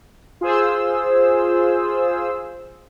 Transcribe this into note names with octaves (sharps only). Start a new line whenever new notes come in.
F4 G#4 C5 E6